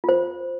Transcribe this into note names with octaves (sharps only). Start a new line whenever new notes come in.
F4 C5